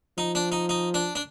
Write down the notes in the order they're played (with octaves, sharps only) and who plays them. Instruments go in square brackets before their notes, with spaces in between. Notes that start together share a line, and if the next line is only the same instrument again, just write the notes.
[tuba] F3 [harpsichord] D#4
[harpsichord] D4
D#4
D#4
D4
D4